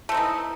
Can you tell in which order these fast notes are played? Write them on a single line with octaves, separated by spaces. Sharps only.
A3 C4 D#4 E3